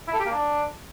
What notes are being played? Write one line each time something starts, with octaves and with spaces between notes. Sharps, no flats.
E4
A4
G4
A#3
D4